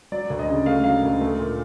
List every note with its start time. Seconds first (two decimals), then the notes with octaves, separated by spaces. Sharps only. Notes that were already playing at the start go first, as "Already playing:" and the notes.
0.12 F#3 D5
0.30 D2
0.39 D#5
0.48 C#3
0.66 A3 F5
0.84 F#3 F5
1.03 D2
1.21 A3
1.39 A#2